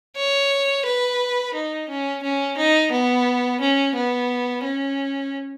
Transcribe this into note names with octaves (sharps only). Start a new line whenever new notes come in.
C#5
B4
D#4
C#4
C#4
D#4
B3
C#4
B3
C#4